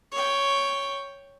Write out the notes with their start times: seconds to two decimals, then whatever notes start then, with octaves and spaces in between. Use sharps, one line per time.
0.12 C#5 G5